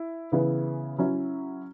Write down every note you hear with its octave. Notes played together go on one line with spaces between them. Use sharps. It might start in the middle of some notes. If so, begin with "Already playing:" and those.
Already playing: E4
C#3 E3 B3 E4
F#3 C#4 E4